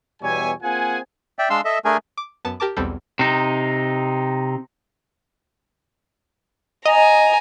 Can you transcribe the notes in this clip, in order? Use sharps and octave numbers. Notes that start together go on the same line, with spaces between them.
E2 B2 G3 C#5 E5 G#5
A#3 C4 F4 G#4 F#5 G#5
D5 E5 G5
G#3 D4 F5 C6 E6
A4 D#5 E5
A3 D4 G#4 A#4 G#5
D6
F#2 B3 A5 A6
G4 A#4 A5 D6
B1 E2 G3 C4 A4
C3 D#4
D#5 G#5 A#5